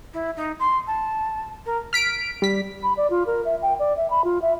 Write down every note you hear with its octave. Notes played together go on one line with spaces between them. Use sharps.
E4
D#4
C6
A5
A#4
F6 B6 D7
G3 B6
B5
D5
F4
A#4
E5
G5
D5
E5
B5
F4
E5